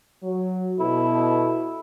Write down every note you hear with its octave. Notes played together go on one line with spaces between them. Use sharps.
F#3
B2 E4 A4